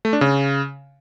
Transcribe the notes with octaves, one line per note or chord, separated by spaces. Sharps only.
A3
D4
C#3